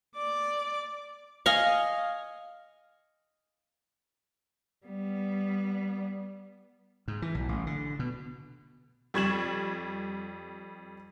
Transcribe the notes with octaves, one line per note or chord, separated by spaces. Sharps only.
D5 D6
D#5 F5 G#5 C#6
G3 B3
G#2
E3
B1
A1
D3
B2
F2 G3 C#6 G#6 E7 F#7